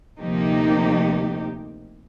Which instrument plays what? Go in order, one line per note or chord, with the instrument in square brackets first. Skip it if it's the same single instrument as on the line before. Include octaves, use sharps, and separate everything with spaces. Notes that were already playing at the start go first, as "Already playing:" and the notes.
[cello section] D2 C3 F3 A#3 D#4 G4